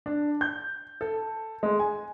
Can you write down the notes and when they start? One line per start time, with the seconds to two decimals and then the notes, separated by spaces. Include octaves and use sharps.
0.06 D4
0.41 G6
1.01 A4
1.63 G#3
1.79 G#5